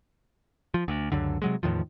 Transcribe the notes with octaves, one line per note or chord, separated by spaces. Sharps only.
F3
D2
C#2 F#2 D3
C3 F#3 G#3
E2 A2 D#3 F3